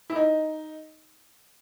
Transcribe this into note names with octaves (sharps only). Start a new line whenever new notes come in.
E4
D#4